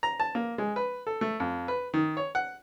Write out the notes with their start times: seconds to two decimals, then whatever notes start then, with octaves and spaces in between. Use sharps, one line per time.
0.03 A#5
0.20 A5
0.35 A#3
0.58 G#3
0.76 B4
1.07 A4
1.21 A3
1.40 F2
1.68 B4
1.94 D#3
2.17 C#5
2.35 F#5